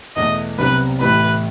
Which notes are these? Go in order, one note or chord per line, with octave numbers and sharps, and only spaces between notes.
E2 B2 A3 D#5
C2 C3 F#3 B3 B4
A1 A2 E3 A3 E4 B4